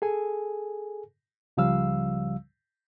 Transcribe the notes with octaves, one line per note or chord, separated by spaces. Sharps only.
G#4 A4 G#5
C#2 C#3 F3 G3 F5 E6